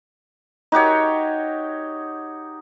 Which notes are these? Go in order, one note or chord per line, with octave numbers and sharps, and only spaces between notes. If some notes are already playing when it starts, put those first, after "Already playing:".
D#4 F#4 G4 C#5